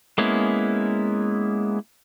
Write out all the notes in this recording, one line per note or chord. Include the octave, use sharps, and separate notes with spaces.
G#3 A#3 B3 C#4 E4